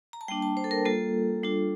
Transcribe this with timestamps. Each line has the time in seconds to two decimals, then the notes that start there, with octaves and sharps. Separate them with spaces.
0.13 A#5
0.21 A5
0.28 G3 A#3 D4 G5
0.42 A5
0.57 C5
0.64 A4
0.71 A#4
0.85 G3 A#3 F4 A4
1.43 G3 D4 F4